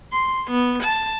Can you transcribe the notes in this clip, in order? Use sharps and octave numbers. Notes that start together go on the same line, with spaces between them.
C6
B3
A5